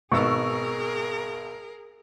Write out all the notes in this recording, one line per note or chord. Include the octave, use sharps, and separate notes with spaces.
G#1 B2 G#4 A#4 C#6 E6